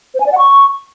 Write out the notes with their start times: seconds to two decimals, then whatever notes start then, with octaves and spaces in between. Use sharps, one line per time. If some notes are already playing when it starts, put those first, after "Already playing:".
0.15 C5
0.20 G#5
0.26 D5
0.32 F#5
0.38 C#6